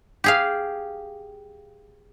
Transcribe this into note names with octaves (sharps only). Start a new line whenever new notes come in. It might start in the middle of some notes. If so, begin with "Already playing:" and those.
G4 G#4 F5